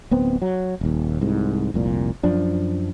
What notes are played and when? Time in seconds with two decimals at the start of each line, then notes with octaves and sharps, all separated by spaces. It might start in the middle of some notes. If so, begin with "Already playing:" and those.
0.11 D1 B3 C4
0.42 F#3
0.81 D#1 D#2
1.21 C2 G#2
1.74 F1 C2 A#2
2.23 F#2 F3 D4